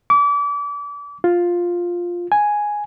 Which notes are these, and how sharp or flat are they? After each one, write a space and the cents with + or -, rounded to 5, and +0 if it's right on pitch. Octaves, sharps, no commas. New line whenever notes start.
D6 -35
F4 +5
G#5 +0